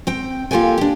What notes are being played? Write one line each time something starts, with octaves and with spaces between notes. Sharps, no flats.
C4 G5
A#3 F4 G4 A4 G5 G#5
D4 G4